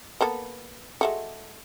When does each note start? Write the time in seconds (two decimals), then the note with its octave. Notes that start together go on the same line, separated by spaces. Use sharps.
0.21 A#3 B3 A4
1.01 G#3 A3 F#4